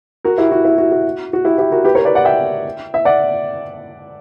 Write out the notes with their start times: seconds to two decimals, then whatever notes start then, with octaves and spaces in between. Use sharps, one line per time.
0.25 F#4 A#4
0.38 E4 G4
0.51 F#4
0.65 E4
0.78 F#4
0.92 F#4
1.33 F#4
1.44 E4 G4
1.58 E4 G4
1.72 F#4 A#4
1.85 G4 B4
1.95 A#4 C#5
2.05 B4 D5
2.15 D5 F#5
2.25 E5 G5
2.94 E5
3.05 D5 F#5